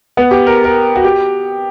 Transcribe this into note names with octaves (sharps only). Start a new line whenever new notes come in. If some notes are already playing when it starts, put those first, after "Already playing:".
B3
G4
A#4
A#4
F#4
G4